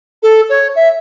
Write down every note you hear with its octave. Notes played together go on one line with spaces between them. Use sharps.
A4
C#5
E5